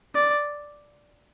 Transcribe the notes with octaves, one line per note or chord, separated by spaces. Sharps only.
D5